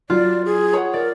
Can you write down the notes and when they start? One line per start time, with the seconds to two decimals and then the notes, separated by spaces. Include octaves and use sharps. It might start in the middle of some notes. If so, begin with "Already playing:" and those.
0.10 F#3 F4 D5
0.45 G#4
0.73 C#5 F#5
0.94 A#4 D5